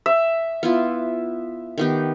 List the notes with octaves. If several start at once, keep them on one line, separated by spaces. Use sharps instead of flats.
E5
B3 E4 F4
D#3 B3 G4